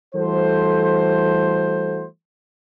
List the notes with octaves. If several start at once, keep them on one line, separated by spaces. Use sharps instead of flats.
E3 G3 A3 F#4 A4 C5